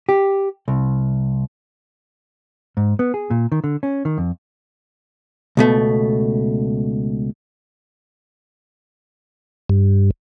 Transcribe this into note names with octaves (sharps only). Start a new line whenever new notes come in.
G4
C2
G#2
B3
G#4
A#2
D#3
D3
C#4
D#3
F2
C#2 B2 A3
G2